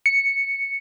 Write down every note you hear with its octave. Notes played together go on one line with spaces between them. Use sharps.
C#7